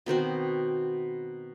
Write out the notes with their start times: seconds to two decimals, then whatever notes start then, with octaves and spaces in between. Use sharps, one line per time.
0.06 B2 D#3 C4 F#4